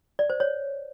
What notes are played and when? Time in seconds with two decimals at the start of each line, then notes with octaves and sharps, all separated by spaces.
0.19 D5
0.30 C5
0.40 C#5